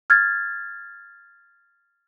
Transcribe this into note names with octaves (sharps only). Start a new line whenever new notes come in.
F6 G#6 A6